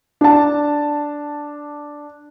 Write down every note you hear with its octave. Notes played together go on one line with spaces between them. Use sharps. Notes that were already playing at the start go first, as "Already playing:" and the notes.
D4 A5